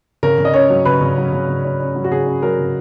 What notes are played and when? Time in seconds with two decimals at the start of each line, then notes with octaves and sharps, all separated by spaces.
0.23 C#3 A#4
0.38 C#3
0.45 D#5
0.54 C#4 C#5
0.70 F#3
0.85 C#3 B4
1.01 C#3
1.18 F#3
1.32 C#3
1.48 C#3
1.65 C#4
1.80 C#4
1.96 F#3
2.04 F#4
2.11 C#3 G#4
2.27 C#4
2.42 F#3 A#4
2.58 C#3